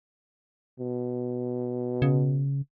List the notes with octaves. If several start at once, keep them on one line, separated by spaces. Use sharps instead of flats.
B2
C#3